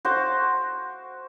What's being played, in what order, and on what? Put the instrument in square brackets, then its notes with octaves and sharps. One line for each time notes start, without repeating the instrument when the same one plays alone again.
[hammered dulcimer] F#4 C5 D6